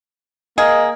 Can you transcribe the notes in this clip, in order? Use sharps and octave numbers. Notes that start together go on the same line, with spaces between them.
A#3 G#4 D#5